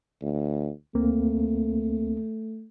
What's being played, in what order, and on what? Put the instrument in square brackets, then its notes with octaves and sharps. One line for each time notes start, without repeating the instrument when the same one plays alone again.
[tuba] D2
[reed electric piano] D2 A#3 C4 [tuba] A3